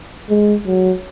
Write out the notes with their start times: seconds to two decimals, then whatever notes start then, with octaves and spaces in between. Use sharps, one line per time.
0.30 G#3
0.67 F#3